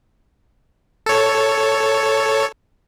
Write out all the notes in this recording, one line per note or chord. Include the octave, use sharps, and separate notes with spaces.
A4 C#5